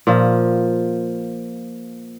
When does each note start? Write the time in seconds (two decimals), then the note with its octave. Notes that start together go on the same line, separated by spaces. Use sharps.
0.07 A#2 F3